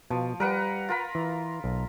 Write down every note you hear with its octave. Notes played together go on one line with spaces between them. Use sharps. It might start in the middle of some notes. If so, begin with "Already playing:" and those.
B2 F3
G3 A#4 B4 F#5
F4 A#4 B5
E3
B1